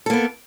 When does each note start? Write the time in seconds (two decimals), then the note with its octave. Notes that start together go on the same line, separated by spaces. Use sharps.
0.06 A4
0.10 A#3
0.13 B3